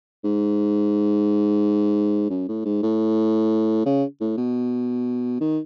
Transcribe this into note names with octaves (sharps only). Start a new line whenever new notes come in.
G#2
F#2
A2
G#2
A2
C#3
A2
B2
D#3